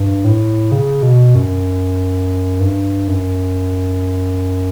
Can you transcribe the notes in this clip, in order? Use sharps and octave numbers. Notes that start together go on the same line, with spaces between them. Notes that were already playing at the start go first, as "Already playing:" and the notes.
Already playing: G2
A2
C#3
B2
F#2
G2
F#2